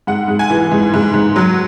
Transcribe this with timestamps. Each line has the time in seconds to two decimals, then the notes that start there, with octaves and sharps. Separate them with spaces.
0.07 G#2 F#5
0.28 G#2
0.39 G#5
0.50 E3
0.72 G#2
0.94 G#2
1.14 G#2
1.36 F#3